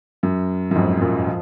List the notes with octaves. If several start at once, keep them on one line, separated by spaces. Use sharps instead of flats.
F#2
F#2
F2 G#2
F#2 A#2
F3